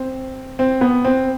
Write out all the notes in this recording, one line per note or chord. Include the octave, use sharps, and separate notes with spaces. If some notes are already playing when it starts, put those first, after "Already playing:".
Already playing: C4
C4
B3
C4